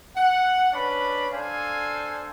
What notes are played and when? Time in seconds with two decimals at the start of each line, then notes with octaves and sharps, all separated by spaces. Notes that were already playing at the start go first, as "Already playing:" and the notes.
0.16 F#5
0.72 C#4 D4 B4 D5 B5
1.32 D4 A4 C5 F5 G#5